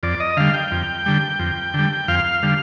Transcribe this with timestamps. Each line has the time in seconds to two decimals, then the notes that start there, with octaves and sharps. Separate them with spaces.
0.03 F2 D5
0.20 D#5
0.37 D3 G3 F5
0.54 G5
0.71 F2
1.06 D3 G3
1.39 F2
1.74 D3 G3
2.08 F2 F5
2.43 D3 G3